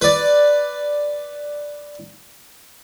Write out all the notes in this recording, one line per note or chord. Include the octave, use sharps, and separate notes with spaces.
B4 D5